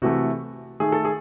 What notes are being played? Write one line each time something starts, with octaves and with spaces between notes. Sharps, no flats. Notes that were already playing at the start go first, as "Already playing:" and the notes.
C3 E3 A3 F#4
D#3 A3 G#4
A4
G#4